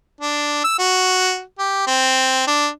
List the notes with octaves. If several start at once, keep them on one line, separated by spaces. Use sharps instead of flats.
D4
E6
F#4
G4
C4
D4